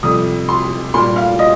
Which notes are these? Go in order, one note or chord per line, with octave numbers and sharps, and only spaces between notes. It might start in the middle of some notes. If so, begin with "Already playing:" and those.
F2 C3 G3 D#6
C6
A#2 G3 C6
F5
D#5